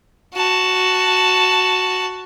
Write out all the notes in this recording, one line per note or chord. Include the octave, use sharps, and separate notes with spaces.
F#4 A5